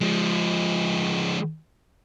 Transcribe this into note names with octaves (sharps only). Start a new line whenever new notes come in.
F3 G#3